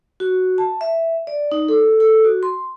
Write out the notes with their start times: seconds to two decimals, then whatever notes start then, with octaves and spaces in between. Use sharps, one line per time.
0.20 F#4
0.58 A5
0.81 E5
1.27 D5
1.52 D#4
1.69 A4
2.00 A4
2.24 F#4
2.43 C6